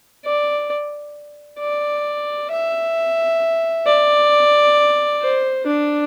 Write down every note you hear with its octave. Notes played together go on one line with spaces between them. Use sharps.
D5
D5
E5
D5
C5
D4